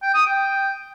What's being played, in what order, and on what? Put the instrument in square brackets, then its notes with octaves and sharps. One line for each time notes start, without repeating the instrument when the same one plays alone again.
[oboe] G5
D#6
G5